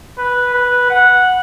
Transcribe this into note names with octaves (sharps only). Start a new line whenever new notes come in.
B4
B4
F#5